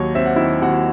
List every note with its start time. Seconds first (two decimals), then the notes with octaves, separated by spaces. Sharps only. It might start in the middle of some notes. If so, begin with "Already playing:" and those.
Already playing: D#2 F#3 C#5
0.15 C4 E5
0.26 F#5
0.36 D#3 E4 E5
0.62 D#2 F#4 F#5